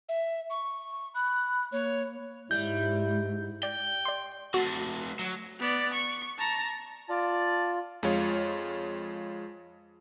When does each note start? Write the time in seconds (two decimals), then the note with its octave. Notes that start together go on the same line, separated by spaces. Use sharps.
0.09 E5
0.50 C#6
1.15 B5 F#6
1.72 A#3 C#5
2.51 G#2 G3 E4 G6
3.63 D5 G5
4.05 D5 C6
4.54 A3 C4 F#4
5.19 F#3
5.60 B3 D5
5.94 C#6
6.38 A5 A#5
7.09 F4 D5 A5
8.03 F2 G#3 F4 C#5